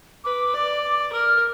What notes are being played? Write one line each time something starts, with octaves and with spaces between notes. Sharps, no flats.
B4 D6
D5
D6
D6
A#4 F6